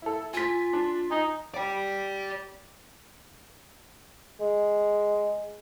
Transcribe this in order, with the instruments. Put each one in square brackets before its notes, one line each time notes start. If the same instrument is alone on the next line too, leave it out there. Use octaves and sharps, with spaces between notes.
[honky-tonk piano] E4 A4
[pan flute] F4 [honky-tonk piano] G#5 B6
[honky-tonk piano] D4
[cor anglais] D#4 [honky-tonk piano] G#5
[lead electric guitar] D5 G5
[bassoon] G#3